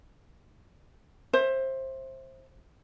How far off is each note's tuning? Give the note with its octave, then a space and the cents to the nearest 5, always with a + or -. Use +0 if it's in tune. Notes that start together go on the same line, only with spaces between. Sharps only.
C5 +20 E5 +0